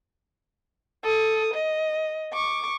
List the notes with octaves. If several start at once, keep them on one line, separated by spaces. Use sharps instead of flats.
A4 D#6
D#5
C#6 D6